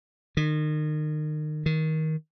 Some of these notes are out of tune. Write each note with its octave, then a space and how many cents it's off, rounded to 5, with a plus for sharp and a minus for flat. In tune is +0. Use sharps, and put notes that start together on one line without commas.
D#3 -30
D#3 +15